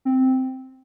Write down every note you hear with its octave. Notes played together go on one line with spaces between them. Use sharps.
C4